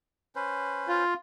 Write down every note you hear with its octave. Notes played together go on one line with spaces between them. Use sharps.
C#4 B4 C5
F4